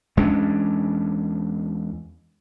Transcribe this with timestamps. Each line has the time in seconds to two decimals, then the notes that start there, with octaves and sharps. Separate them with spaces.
0.17 E2 G#3 C#4 D4